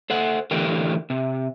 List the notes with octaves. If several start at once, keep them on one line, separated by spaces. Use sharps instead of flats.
A4 C5 F#5
A2 D3 E3 G4 A#4 G5
C3